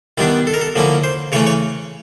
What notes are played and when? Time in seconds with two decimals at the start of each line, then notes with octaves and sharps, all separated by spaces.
0.18 D#3 G3 B3 D4 E4
0.47 A4
0.54 A#4
0.61 A4
0.76 D3 F3 A#3 C#4 E4
1.04 C5
1.32 C#3 E3 A3 C#4 C#5
1.47 C#5